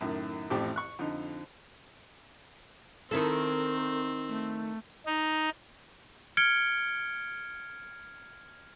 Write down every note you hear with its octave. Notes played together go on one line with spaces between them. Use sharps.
F#2 A2 D#3
A1 F2 A2 C4 G4 D6
C#6 F#6
F2 D3 D#4
D#3 C4 E4 A4 A#4
A3
D#4
F6 G#6 C#7 D7 G7